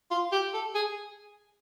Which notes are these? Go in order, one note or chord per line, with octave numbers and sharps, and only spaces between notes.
F4
G4
A4
G#4